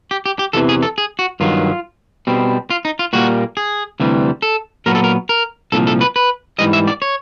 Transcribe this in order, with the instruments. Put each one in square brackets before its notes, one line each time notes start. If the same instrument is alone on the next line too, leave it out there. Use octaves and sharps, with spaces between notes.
[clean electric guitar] G4
G4
G4
E2 C3 E3 A4
G#4
A4
G#4
F#4
G2 D#3 F#3 F4
B2 G3 C4
F4
D#4
F4
A#2 G3 A#3 F#4
G#4
D2 C3 E3 G3
A4
A#2 F#3 B3 A#4
A4
A#4
A#4
C2 A#2 F3 A4
A4
B4
B4
G#2 E3 G3 D#5
E5
D5
C#5